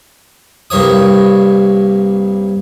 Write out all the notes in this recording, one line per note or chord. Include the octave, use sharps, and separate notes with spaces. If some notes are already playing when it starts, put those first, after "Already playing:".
C2 G2 A#3 C#5 D#6